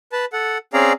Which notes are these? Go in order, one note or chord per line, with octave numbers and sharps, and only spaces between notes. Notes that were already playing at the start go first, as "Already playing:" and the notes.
B4 A5
A4 F#5
C4 C#4 G#4 D5 F5 A#5